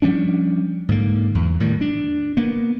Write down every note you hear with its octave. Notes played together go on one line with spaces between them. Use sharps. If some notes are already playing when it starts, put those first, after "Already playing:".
F3 G3 C#4 D4
G#2 D3 A#3
E2
A2 D#3 G3
D4
A#3 B3